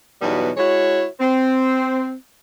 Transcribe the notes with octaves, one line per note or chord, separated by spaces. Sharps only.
E2 B2 F#3 G3 B3 D#4
G#3 E4 F#4 C#5
C4